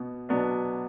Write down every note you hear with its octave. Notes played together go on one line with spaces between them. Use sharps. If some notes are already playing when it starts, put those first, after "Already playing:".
Already playing: B2 B3
B2 F#3 B3 D4